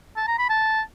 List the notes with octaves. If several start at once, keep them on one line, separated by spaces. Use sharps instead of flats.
A5
A#5
B5
A5